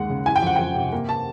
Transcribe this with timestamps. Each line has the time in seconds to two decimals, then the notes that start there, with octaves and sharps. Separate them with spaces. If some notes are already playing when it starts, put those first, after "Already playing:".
Already playing: D#2 G#3 F#5
0.09 C#3
0.25 E3 G#5
0.36 G5
0.42 F2 F#5
0.56 F2 G5
0.75 C3
0.93 A#3
1.09 A5